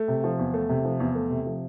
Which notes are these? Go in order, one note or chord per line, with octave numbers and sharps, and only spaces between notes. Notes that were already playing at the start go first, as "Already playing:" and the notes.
Already playing: A3
C3
F3
E2
A3
C3
F3
E2
A3
C3
F3